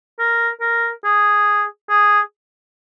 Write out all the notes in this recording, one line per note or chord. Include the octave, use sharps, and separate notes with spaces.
A#4
A#4
G#4
G#4